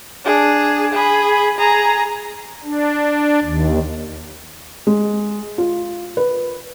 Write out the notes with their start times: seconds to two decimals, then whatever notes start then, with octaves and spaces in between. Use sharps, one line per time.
0.25 D4 G#4
0.93 G#4 B5
1.58 G#4 A#5
2.64 D4
3.44 D#2
4.87 G#3
5.58 F4
6.17 B4